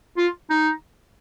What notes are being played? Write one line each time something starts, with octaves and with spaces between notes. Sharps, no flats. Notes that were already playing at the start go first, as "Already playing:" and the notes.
F4
D#4